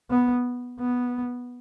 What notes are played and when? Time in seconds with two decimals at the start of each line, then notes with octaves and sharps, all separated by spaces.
0.10 B3
0.79 B3